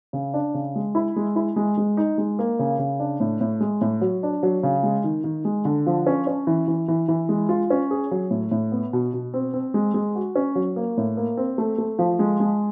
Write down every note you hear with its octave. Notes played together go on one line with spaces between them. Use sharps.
C#3
D4
C#3
G#3
E4
G#3
E4
G#3
G#3
D#4
G#3
A#3
C#3
C#3
D4
A2
A2
G#3
A2
F#3
D4
F#3
C#3
G#3
D#3
D#3
G#3
D3
F3
C#4
C#4
E3
E3
E3
E3
G#3
F4
C#4
G#4
F#3
A2
A2
B3
B2
B2
C4
C4
G#3
G#3
F#4
C#4
F#3
A#3
A2
A#3
C4
A3
A3
F3
G#3
G#3